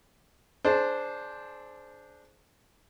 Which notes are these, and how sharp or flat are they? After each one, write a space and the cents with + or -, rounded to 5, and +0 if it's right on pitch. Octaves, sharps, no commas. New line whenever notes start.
D4 +0 G#4 +30 C5 +0